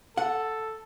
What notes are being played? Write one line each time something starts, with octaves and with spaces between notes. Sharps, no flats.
A4 F#5